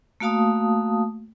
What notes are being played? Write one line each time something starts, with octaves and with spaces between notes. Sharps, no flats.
A3 A#3 F#4 F5 A5 D#6